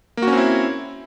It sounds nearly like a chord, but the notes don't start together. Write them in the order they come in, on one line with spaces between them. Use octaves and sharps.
A#3 F#4 C#4 C4 E4